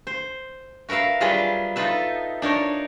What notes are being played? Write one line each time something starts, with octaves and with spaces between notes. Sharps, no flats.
C5
F#4 A#4 B4 E5 F5
F#3 G3 F4 G#4 B4
D#4 F4 A4 B4 E5
D4 D#4 A#4 C#5